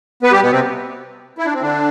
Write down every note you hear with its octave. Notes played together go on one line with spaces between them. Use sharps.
B3 B4
G3 G4
B2 B3
C3 C4
E4
D4
C4
D3 D4